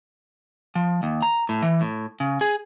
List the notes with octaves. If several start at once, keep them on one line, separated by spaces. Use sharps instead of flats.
F3
D#2
A#5
A2
E3
A2
C#3
G#4